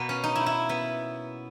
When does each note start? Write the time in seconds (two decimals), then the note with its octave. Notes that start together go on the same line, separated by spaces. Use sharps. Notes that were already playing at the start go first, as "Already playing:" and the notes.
Already playing: B2 A#3 B3
0.09 C#4
0.24 D#4
0.36 E4
0.46 E4
0.69 B3